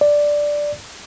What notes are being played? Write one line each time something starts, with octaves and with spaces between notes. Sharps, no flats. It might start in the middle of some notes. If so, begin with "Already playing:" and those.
D5